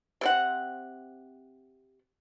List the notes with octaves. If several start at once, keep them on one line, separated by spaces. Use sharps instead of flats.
C3 C4 F#5